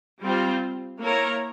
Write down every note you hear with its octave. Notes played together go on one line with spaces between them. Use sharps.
G3 C4 F4 C5
A#3 E4 A#4 C#5